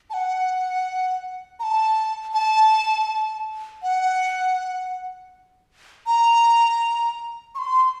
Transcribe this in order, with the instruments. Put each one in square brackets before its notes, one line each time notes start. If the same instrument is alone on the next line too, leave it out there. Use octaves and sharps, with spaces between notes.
[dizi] A5
F#5
A#5
A5
A5
F#5
A#5
C#6
C6